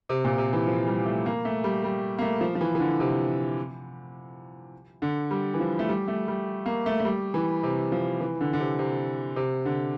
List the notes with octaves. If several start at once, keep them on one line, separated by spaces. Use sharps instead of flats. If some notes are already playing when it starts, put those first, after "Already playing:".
C3
A#2
C3
E3
F3
G3
A3
A#3
A3
G3
G3
A#3
A3
F3
F3
E3
E3
D3
C3
D3
G3
E3
F3
A3
G3
A3
G3
A#3
A3
A3
G3
E3
C3
F3
E3
D3
D3
C3
C3
C3
D3